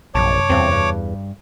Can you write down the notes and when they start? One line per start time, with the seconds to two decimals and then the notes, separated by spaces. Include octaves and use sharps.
0.15 A#1 F#2 C3 C#5 A5 D6
0.50 E2 G2 C4
0.71 G2